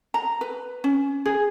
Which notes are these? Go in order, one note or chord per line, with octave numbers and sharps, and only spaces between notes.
A#5
B4
C#4
G#4